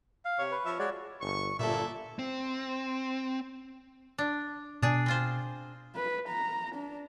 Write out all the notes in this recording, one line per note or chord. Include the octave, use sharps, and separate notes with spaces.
F5
C3 C#5
B4
F3 C#5 E5
G#3 F#4 C#5 D5
G1 C#6
G1 A#2 E4 A4 D5 E5
C4
D4
B2 D4 G#4
C4 F4 C5
B4
A#5
D4